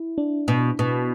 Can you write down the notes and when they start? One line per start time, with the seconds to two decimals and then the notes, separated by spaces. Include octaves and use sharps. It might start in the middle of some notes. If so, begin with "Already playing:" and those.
Already playing: E4
0.18 D4
0.48 B2
0.79 B2